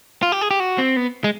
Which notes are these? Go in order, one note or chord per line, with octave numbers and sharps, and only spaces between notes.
F4
G4
G#4
G4
F#4
C4
B3
G#3